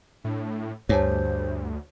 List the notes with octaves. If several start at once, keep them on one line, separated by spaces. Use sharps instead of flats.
A2 D4
D2 G2 C5 C#5 G#5 A5